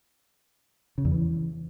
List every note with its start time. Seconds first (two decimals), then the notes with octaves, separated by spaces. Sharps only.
0.98 C#3
1.05 E2
1.12 E3